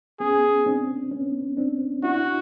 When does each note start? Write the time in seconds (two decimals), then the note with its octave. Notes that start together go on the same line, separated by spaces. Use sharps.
0.20 B3 C#4 G#4
0.66 C4 D4
1.11 B3 C#4
1.57 C4 D4
2.03 D4 E4 F#4